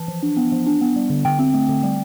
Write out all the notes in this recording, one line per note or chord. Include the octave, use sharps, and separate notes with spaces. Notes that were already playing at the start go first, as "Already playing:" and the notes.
Already playing: E3 A5
F3
D4
B3
F3
D4
B3
G3
D3
D3 G5
C4
A3
D3
G3